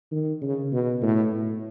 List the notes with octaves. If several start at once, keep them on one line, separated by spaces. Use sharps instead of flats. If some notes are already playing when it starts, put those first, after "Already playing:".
D#3
C#3
B2
A2
A2